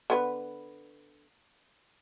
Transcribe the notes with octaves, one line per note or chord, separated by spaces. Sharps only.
D3 B3 B4